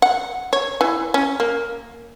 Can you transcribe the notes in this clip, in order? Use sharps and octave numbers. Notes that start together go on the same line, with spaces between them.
F#5
C#5
E3
C#4
A#3